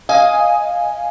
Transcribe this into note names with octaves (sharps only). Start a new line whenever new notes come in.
D#5 F5 G#5